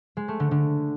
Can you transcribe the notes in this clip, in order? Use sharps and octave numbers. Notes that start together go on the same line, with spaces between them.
G#3
A3
D3
D3